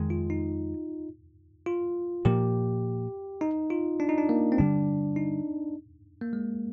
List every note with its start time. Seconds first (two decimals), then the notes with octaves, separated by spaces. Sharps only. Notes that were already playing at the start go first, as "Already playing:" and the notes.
Already playing: F2 D#3 G#3
0.10 F4
0.30 D#4
1.66 F4
2.25 A#2 F3 A#3 G4
3.41 D#4
3.70 F4
4.00 D4
4.09 D#4
4.18 D4
4.29 A#3
4.52 C4
4.58 G2 D3 G3 D4
5.16 D#4
6.22 A#3
6.33 G#3